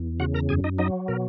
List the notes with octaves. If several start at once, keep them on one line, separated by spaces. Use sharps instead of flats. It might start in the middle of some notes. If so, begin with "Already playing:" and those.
Already playing: E2
C#3 F#4 F#5
A#4 A#5
F#2 G#4 G#5
D#4 D#5
F#3 D#4 D#5
B2 A#4